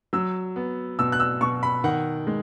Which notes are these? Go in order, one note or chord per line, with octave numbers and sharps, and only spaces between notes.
F#3 E6
B3
B2 E6
F#6
E6
B2 C#6
B5
D#3 F#5
G#3